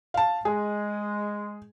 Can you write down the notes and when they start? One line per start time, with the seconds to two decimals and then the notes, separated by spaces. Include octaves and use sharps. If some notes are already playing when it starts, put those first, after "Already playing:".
0.14 F5 A5
0.45 G#3 G#4